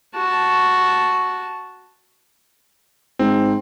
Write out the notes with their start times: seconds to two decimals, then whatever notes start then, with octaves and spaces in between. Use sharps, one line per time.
0.16 F#4 A5
3.19 G#2 C4